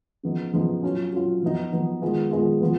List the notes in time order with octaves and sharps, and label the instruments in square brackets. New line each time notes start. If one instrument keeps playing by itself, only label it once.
[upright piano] C#3 F3 B3 D#4
C#3 F3 B3 D#4
F#3 C#4 F4
F#3 C#4 F4
F3 B3 D#4
F3 B3 D#4
D#3 G#3 B3 F4
D#3 G#3 B3 F4
F3 B3 F4